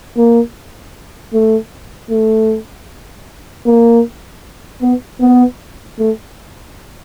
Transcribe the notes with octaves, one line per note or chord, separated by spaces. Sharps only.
A#3
A3
A3
A#3
B3
B3
A3